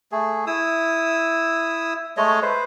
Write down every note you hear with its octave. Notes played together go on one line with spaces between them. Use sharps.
A3 G#4
E4 D#6 E6
G#3 A3 C#5 D#5
B4 C5